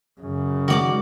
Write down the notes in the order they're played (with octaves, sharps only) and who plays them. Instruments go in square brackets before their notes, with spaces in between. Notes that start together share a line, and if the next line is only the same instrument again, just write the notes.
[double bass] F#2 C#3
[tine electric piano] D#3 G#3 [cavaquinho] F#4 D5 D6